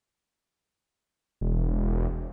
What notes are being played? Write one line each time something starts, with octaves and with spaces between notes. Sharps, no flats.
E1